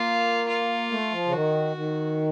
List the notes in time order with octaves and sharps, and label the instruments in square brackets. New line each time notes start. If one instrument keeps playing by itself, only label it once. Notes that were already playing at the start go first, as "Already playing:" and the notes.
Already playing: [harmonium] A#3 [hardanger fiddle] F4
[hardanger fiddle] F4
[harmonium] A3
F3
C#3
[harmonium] D#3 [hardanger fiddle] F#4
[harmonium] D#3